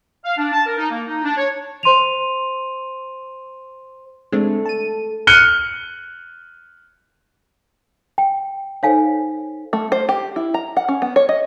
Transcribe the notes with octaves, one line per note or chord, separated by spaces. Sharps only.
F5
D4
A5
A#4
D#4
A#3
D#4
D4
C#5
C5 C6 D#7 F7
G#3 A3 C4 D4
A5 D#7
F6 F#6 C#7 D#7 G7
G5
D#4 A4 C5 C#5 F5 G#5
A3
C5
G4
E4
A#5
F#5
C#4
B3
C#5
D#5